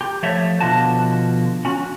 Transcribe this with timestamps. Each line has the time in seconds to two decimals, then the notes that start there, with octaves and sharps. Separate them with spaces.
0.01 G4
0.23 F3 A3 C#5 E5
0.60 B2 D3 F3 F#4 A5
1.65 C#4 F#4